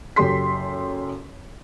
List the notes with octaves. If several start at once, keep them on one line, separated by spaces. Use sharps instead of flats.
F#1 F#2 G4 A4 C6 B6